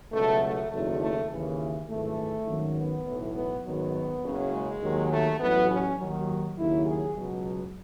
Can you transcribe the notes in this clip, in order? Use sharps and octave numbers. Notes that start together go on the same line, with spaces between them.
C#2 B2 F#3 A3
A3
F#1 E2 D#3 F#3 A3
A3
D#2 C#3 E3
G#1 F#2 E3 A3
G#1 F#2 D#3 F#3
B3
B1 A2 E3
B3
G#1 F#2 D#3 F#3 B3
F#1 F#2 C#3 F#3
G#3
D#2 D#3 F#3
A3
A1 A2 F#3 B3
C#4
D#2 D#3 F#3
D#2 C#3 F#3 E4
G#4
C#2 B2 F#3